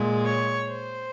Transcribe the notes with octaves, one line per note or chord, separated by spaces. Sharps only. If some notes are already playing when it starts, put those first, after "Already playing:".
Already playing: A#2 G#3
C#5
C5